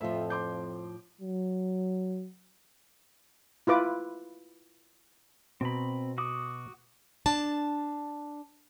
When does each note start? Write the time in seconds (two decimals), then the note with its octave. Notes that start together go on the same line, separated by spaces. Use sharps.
0.01 F2 A2 F3 F4 E5
0.30 C6 D6 G6
1.21 F#3
3.67 E4 F4 B4 D6
5.61 B2 C4 A#5 B5
6.18 F#4 D6 D#6
7.26 D4 A5